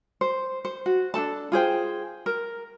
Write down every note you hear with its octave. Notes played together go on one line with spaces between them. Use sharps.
C5
C5
F#4
D4 D#4 A4 A5
F4 G#4 C5 G5
A#4